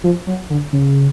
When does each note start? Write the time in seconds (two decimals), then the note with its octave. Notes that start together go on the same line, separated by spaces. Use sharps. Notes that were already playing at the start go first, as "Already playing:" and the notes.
0.04 F3
0.27 F#3
0.50 D3
0.73 C#3